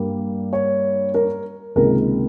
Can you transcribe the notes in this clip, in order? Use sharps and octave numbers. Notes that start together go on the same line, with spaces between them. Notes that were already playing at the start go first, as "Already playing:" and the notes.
Already playing: G2 G3 A#3
C#5
A#4
C#2 C3 D#3 A#3 A#4